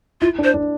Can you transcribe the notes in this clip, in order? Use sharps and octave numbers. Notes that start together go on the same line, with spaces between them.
E4 F4
D4
C5
D4